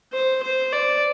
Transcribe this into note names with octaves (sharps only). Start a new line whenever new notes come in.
C5
C5
D5